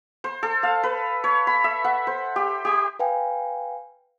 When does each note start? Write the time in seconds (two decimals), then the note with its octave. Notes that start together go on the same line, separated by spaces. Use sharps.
0.24 C5
0.43 A4
0.63 F5
0.83 B4
1.24 C#5
1.47 B5
1.64 E5
1.84 F#5
2.07 C5
2.36 G4
2.65 G4
2.99 B4 F5 G5 G#5